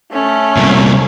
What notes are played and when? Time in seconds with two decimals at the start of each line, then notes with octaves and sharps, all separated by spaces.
0.12 A3 C#4
0.57 C2 A#2